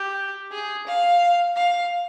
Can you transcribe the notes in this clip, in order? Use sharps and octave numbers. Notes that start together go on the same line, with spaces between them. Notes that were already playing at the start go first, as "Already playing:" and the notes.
Already playing: G4
G#4
F5
F5